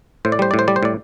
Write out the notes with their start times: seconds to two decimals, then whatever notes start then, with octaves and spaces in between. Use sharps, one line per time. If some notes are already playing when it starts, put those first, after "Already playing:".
0.25 A2 C5
0.32 D5
0.39 G3 C5
0.51 A2 D5
0.59 C5
0.68 G3 D5
0.76 C5
0.83 A2 D5